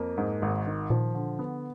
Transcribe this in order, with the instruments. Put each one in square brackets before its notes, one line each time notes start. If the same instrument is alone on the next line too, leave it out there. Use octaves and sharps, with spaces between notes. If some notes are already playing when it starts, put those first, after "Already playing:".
Already playing: [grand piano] F2 A#3
G#2
G#1
D#3
[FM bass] A#2 [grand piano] F3
[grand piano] D3
B3